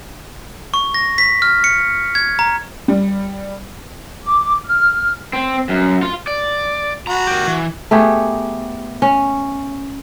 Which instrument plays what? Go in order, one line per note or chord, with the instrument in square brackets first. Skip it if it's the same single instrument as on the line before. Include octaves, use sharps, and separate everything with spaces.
[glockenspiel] C#6
A#6
B6
F6
C#7
G#6
A#5
[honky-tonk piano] G3
[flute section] D6
F6
[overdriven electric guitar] C4
F#2
F4
D5
[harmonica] F#4 [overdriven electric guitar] A#5 B5
[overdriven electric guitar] G4 A#4
E3
[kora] A3 B3 G4 G#4
C#4